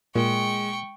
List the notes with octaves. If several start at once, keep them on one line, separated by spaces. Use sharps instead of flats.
A#2 G#3 G5 C#6